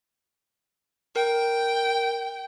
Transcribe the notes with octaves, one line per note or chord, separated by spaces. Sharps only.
A#4 G5